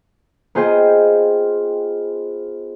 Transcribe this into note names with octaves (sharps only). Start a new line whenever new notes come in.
B3 F4 G#4 C5 D#5 G5